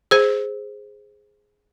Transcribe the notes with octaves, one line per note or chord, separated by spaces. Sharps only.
G#4 C5